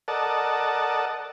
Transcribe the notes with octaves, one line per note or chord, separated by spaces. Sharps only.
A4 A#4 D5 D#5 F#5 A5